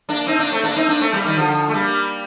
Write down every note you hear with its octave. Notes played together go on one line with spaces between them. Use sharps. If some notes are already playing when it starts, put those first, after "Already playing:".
A#3 D4
C4 D#4
A#3 D4
A3 C4
A#3 D4
C4 D#4
A#3 D4
A3 C4
G3 A#3
D#3 G3
D3 F3
A3
G3 A#3